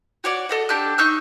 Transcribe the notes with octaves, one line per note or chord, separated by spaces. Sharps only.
F#4 C#5 D5 F#5
A4 D#5 F#5
D4 G4 A4 F#6
D#4 C#6 E6 F#6